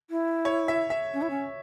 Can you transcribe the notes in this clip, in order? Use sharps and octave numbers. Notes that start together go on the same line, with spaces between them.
E4
C#5
E5
E5
C#4
E4
C#4